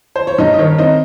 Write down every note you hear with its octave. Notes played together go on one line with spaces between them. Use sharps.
C5
C#5
G2 D#4 D#5
D#5
D#3 C#5
C4 D#4 D#5